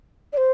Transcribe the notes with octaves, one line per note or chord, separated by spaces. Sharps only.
D5
C5